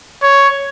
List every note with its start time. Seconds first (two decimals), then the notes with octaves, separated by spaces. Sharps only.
0.23 C#5